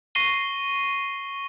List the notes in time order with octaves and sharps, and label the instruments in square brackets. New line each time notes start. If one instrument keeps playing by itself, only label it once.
[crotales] C#6 A#6 C7 D#7 G7